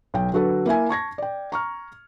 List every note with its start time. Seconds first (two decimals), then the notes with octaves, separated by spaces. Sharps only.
0.14 B1 G5
0.33 D3 F#3 F#4 A4 B4
0.66 A#3 E4 E5 G#5
0.89 A5 C#6 G#6 A#6
1.18 D5 G5
1.52 A#5 C#6 F6